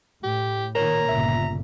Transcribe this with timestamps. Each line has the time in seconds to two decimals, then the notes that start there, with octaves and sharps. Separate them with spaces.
0.23 A2 G4
0.75 A#2 D#3 A#4 C#5 A#5
1.09 G1 A#2 C#3 E5